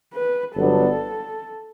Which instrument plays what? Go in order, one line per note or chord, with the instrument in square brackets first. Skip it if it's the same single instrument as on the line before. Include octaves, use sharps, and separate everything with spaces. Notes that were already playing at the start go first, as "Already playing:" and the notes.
[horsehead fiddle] B4
[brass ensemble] G1 G2 F#3 B3 D4 [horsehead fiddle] A4